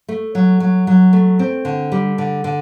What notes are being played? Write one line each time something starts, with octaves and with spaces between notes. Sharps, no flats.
A3
F#3
F#3
F#3
A3
C4
D3
G3
D3
D3